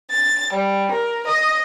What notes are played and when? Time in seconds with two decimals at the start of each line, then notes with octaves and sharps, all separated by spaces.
0.11 A6
0.51 G3
0.91 A#4
1.27 D#5